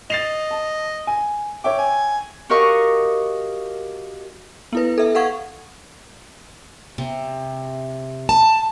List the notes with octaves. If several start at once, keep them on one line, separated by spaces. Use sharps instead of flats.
D#5 A6 C7 F7
A5
G#5
C#5 E5 G5 D6
G#5
F#4 G4 A#4 D#5 F5 C#6
B3 E4 B4
A4 E5
A4 F5 F#5 C#6 G#6
C3
A5